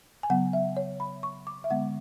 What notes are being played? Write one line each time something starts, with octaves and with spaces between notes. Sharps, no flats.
G#5
C#3 F#3 B3 F#5
E5
C#5
B5
C#6
D6
E5
D3 G#3 B3 F#5